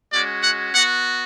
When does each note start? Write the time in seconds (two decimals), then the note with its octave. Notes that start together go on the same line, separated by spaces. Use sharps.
0.13 G#3 C#4 F#4 D5
0.43 F#5
0.74 B3 F#4 F#5